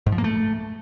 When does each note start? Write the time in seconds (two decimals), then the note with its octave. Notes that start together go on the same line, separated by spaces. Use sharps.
0.06 G#2
0.12 F3
0.18 A#3
0.24 A3